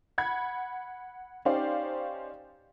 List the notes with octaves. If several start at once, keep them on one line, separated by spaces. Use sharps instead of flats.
F#5 B5 G#6
C#4 D#4 G4 C5 D5 F5